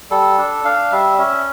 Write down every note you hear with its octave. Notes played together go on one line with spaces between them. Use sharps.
G3 A4
D4
D4 F5
G3 E5
C#4 E5